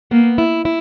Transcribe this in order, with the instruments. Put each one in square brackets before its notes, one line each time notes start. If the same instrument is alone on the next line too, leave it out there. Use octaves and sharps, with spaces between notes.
[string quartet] A#3 [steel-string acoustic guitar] B3
[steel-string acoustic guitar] E4
E4